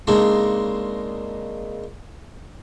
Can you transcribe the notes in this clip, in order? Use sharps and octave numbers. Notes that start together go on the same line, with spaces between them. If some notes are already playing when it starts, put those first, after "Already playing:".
C#3 G#3 A#3 C4 D4 D#4